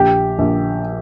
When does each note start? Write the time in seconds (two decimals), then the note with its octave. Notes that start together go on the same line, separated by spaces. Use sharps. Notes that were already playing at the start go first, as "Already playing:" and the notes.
Already playing: A#1 G4
0.39 A#1